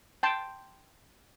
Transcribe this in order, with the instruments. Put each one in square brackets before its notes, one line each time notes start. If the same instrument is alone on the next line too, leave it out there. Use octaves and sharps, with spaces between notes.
[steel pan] G5 A5 C6